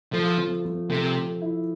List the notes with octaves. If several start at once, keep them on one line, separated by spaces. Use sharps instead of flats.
F3 A3
F3
F3
C3 A3
A3
E4